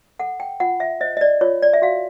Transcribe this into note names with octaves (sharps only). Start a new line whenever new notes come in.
A4 F#5
G5
F4 F#5
E5
C5 D#5
D#5
D5
F4 C#5
D5
E5
F#4 F5